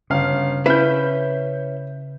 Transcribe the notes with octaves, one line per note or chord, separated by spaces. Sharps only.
G1 C#3 F5
C#4 E4 B4 G6 B6